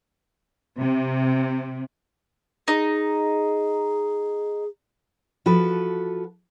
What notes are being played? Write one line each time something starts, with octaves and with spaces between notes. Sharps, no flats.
C3
D#4 G#4
F3 F#4 A4 B4